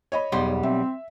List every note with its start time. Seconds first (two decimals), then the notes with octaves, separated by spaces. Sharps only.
0.12 C#5 D#5 B5
0.32 B1 E2 G3 C6
0.63 C4 E5